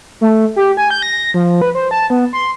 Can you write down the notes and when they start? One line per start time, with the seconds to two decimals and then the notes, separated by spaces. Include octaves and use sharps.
0.21 A3
0.56 G4
0.77 G#5
0.90 G6
1.02 A#6
1.34 F3
1.62 B4
1.75 C5
1.91 A5
2.10 B3
2.33 C6